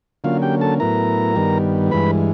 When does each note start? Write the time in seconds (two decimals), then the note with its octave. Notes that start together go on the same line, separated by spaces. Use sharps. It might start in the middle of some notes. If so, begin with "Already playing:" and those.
0.24 D3 F#3 A#3 C#4 F4 F5
0.42 G4 G5
0.61 A4 A5
0.80 A2 F#3 B3 E4 A#4 A#5
1.36 G2 D#3 G3 B3
1.91 G2 E3 G#3 B4 B5